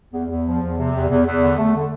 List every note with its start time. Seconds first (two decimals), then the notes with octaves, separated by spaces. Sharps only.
0.12 E2
0.29 E2
0.44 F3
0.61 E2
0.77 C3
0.94 E2
1.09 E2
1.25 E2
1.41 D3
1.57 A3
1.74 D3